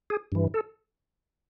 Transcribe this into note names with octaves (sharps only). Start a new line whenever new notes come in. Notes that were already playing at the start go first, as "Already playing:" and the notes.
G#4
G2 E3
A4